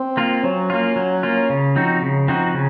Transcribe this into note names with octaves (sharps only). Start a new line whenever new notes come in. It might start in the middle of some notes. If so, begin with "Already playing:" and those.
Already playing: C4
A#3 F4
F#3 C#4
A#3 F4
F#3
A#3 F4
C#3
F3 C4 D#4 F#4
C#3
F3 C4 D#4 F#4
C#3